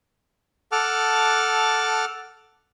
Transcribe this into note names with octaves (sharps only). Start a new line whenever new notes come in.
A4 F#5 A5 D6 F6